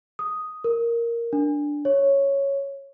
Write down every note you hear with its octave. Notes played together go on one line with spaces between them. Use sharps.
D#6
A#4
D4
C#5